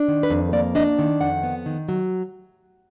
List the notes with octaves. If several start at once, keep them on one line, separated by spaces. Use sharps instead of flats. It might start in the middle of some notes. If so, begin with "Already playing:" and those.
Already playing: D4
D#3
B4
F2
A#3 D5
D4 D#5
D#3
F2 F#5
B3
D#3
F#3